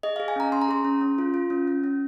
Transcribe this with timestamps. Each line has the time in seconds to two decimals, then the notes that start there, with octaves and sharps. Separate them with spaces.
0.03 G#4 D#5
0.16 G#4 F5
0.28 G#5
0.36 C#4 A#5
0.52 C#4 C6
0.62 A#5
0.69 G#4 C6
0.85 C#4
1.01 C#4
1.18 F4
1.34 F4
1.50 C#4
1.67 C#4
1.84 C#4